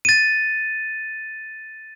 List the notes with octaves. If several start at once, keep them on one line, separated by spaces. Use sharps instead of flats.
A6 D#7